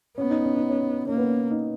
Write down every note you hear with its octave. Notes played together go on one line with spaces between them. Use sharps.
B3 C#4
D#4
C#4
D#4
C#4
A#3 C#4
B3
C#4
D#4